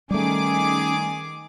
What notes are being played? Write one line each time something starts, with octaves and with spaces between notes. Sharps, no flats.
D#3 G3 A3 C#4 G#4 D6